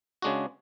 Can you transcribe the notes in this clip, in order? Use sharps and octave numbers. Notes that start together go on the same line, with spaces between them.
C#3 G#3 D4 F#4